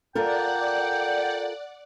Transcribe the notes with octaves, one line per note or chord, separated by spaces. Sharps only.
F4 A4 A#4 D5 F#5 G5